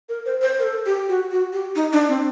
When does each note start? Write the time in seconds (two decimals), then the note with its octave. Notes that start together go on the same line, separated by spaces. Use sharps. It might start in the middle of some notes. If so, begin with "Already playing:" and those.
0.09 A#4
0.26 C5
0.42 C5
0.59 A#4
0.64 A4
0.86 G4
1.08 F#4
1.31 F#4
1.53 G4
1.75 D#4
1.93 D4
2.09 C4